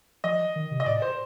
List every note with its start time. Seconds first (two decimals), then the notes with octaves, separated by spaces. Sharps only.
0.24 F3 D#5
0.56 D#3
0.71 C3
0.80 D#5
0.86 A2 D5
1.02 C5